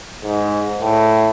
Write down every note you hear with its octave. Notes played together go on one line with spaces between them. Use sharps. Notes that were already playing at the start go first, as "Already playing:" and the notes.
G#2
A2